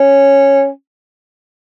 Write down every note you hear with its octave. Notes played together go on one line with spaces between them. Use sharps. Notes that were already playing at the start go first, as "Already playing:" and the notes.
Already playing: C#4